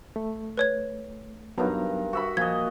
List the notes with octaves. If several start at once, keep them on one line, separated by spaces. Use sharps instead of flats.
A3
B4 C#5 G#6
G2 F#3 B3 D#4 A#4 A#5
F#4 E5 B5
A#2 F3 D#5 G#6